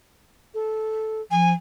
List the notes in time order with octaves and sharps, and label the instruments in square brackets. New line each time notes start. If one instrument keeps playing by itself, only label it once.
[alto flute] A4
[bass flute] F3 [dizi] G#5